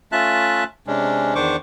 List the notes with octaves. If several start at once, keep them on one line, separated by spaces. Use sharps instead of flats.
A3 C#4 F4 E5 A5 F#6
C3 G#3 C#4 D4
E2 D#3 D4 C5 C#6 D6